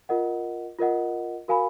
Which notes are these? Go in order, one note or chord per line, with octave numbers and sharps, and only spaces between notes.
F4 A#4 D#5 F#5
F4 A#4 D#5 F#5
F#4 A#4 F5 G#5 B5